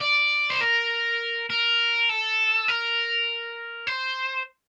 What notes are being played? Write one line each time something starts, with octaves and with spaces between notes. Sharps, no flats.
D5
C5
A#4
A#4
A4
A#4
C5